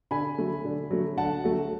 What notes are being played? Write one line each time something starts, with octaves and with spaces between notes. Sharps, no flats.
D3 G#5 B5
F#3 A3
D3
F#3 A3
D3 F#5 A5
F#3 A3